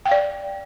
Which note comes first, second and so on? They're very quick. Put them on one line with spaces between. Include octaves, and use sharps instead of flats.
G5 F5 D5